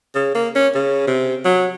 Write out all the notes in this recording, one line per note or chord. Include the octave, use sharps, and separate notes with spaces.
C#3
A#3
C#4
C#3
C3
F#3